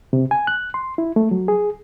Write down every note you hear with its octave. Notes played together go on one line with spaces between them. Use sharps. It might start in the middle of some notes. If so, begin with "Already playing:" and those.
C3
G#5
F#6
C6
E4
A3
F#3
G#4